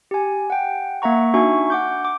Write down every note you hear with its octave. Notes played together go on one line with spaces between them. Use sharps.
G4 G#5
F#5 G5
A#3 E5 F#5 A#5 C#6
D4 D#4 F#4 E5 G#5 C#6
F#5 D6 G6
D6